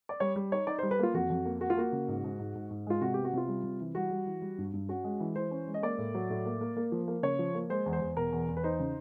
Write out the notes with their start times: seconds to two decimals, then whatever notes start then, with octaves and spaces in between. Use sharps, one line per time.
0.09 D5
0.20 G3 C#5
0.36 G3
0.52 D#4 C#5
0.67 D#4 D5
0.79 C5
0.83 G3
0.91 B4
0.99 A#3 F4
1.14 F2 F#4
1.30 F2
1.45 A#3
1.61 A#3 F#4
1.70 F4
1.77 A#3 F#4
1.92 C#3
2.08 G#2
2.24 G#2
2.39 G#2
2.55 G#2
2.71 G#2
2.87 G#3 F4
3.01 C3 F#4
3.14 B3 G4
3.24 F#4
3.33 C3 F4
3.48 G3
3.64 C3
3.80 E3
3.95 G3 F#4
4.11 G3
4.26 E3
4.42 G3
4.58 G2
4.74 G2
4.89 C#4 F#4
5.04 G#3
5.20 E3
5.36 E3 C5
5.51 C#4
5.67 G#3
5.74 D#5
5.82 A#3 D5
5.98 A2
6.14 F#3
6.30 A2
6.46 A#3
6.61 A#3
6.77 A#3
6.92 F3
7.08 A#3
7.23 C#3 C#5
7.39 F3
7.55 A#3
7.70 G#3 C5
7.86 E2
7.93 C5
8.01 E2
8.17 B2 A#4
8.32 E2
8.48 E2
8.57 B4
8.64 D#4 C5
8.80 C#3